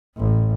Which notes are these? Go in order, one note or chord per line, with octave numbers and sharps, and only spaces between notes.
A1